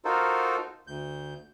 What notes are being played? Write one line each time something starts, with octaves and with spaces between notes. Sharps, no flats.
D#4 F4 F#4 A4 A#4 C5
D2 G6